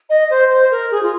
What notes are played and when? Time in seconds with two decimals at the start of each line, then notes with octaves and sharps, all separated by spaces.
0.10 D#5
0.30 C5
0.50 C5
0.71 A#4
0.91 G#4
1.03 F4